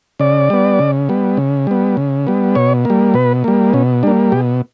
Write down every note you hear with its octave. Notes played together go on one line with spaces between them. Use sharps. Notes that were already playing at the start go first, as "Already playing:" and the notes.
C#3 D5
G3 B3
C#3
G3 B3
C#3
G3 B3
C#3
G3 B3
B2 C#5
G3 A#3
B2 B4
G3 A#3
B2 C#4
G3 A#3 D4
B2 G4